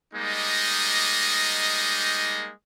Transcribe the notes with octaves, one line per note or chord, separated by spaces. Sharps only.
G3 G#3 A#3 D#4 D#5